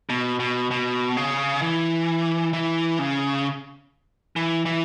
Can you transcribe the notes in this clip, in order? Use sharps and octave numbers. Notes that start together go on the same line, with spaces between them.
B2
B2
B2
C#3
E3
E3
C#3
E3
E3